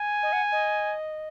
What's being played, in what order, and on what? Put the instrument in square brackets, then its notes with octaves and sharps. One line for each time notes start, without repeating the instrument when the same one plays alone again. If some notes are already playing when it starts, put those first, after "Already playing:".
Already playing: [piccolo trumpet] G#5
[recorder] D#5
F#5
D#5